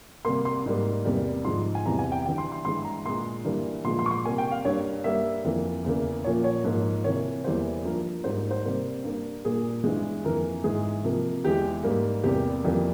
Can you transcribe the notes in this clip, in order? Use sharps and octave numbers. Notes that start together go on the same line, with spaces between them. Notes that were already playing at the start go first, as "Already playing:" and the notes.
C3 G3 A#3 C6
C6
G#2 G3 A#3
E2 C3 G3 A#3
G#2 F3 G#3 C6
G#5
E2 C3 E3 G3 A#5
G#5
G5
G2 E3 G3 G5
C6
C6
G2 E3 G#3 C6
A#5
A#2 G#3 C6
G2 E3 G3 A#3
A#2 F3 G#3 C6
C6
C#6
C6
C3 G3 A#3 G#5
G5
F5
G2 G3 A#3 C#5
G2 G3 A#3 E5
F2 E3 A#3
E2 C#3 E3 A#3
A#2 F3 A#3 C#5
C#5
G#2 F3 A#3
C3 E3 A#3 C#5
E2 E3 G3 A#3 C5
G2 F3 A#3 A#4
G#2 G3 A#3 C5
C5
C3 G3 A#3
G2 G3 A#3
A#2 G3 A#3 G#4
G2 E3 G#3
F2 E3 A#3 A#4
G#2 E3 G#3 G#4
C3 F3 A#3
E2 E3 G#3 G4
G#2 G3 A#3
E2 C3 G3 A#3 G4
F2 E3 G3 A#3